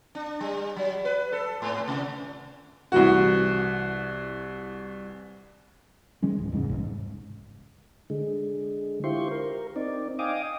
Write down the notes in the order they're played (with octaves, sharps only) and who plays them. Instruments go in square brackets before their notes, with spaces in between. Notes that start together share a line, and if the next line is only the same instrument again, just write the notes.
[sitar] D4
G3
F#3
B4
A4
G#2
C3
[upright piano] C2 E3 F#4
[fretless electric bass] D#3 G3 G#3 C#4
D1
E2 G#2 C#3
F#1 C2
G#2
[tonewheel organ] D3 G#3
E4 F4 G4 C5 C6 C#6
A#4
C4 D#4 D5
D#5 F5 G5 G#5 D6 D#6